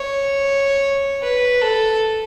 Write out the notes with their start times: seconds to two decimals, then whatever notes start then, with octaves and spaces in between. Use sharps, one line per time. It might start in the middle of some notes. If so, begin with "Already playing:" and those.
Already playing: C#5
1.23 B4
1.62 A4